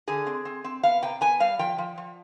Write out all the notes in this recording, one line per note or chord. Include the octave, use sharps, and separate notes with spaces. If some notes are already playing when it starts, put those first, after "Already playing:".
D3 G#4
C4
C4
C4
B3 F5
C3 G5
B3 G#5
G3 F5
F3 G5
F3
F3